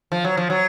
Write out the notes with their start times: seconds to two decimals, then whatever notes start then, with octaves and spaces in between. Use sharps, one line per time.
0.12 F3
0.24 F#3
0.37 F3
0.50 F#3